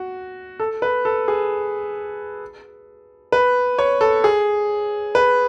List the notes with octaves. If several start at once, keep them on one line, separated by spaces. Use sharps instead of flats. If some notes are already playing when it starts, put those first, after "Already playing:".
Already playing: F#4
A4
B4
A4
G#4
B4
C#5
A4
G#4
B4